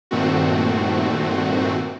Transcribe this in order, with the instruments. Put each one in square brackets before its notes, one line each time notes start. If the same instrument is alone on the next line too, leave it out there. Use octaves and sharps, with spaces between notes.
[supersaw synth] G2 A#2 D#3 A3 C4 F#4